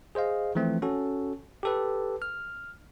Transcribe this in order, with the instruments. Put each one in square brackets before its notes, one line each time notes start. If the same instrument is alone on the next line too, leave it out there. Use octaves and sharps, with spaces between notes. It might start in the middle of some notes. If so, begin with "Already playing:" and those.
[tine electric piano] G#4 C5 D#5 F5
E3 F3 A3 C4
C#4 F#4 A4
G4 A4 B4
F6